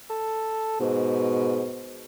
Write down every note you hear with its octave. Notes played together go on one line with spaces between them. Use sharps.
A4
G#2 B2